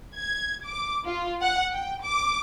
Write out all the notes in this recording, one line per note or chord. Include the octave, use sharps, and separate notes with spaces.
G#6
D6
F4
F#5
G5
D6